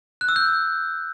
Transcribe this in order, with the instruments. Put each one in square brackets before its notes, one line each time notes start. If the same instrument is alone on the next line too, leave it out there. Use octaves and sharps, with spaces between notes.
[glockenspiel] F#6
E6
G6